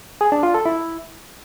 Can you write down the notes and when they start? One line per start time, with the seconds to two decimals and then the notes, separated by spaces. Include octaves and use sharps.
0.21 G#4
0.32 D4
0.43 F4
0.54 A4
0.66 E4